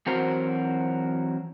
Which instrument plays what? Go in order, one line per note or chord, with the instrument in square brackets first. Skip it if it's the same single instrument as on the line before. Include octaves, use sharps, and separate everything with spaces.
[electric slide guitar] E3 F#3 C4 F#4 A#4 C5